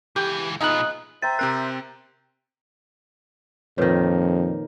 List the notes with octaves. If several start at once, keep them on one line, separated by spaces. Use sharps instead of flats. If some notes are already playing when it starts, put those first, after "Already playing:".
C#2 E3 G4
A#2 B3 D#4 F4 G#4 D#5 F#6
C5 E5 G5 A#5 A6
C3 C4 A#4 F#6
F2 A#2 D#3 A#4 B4 C#5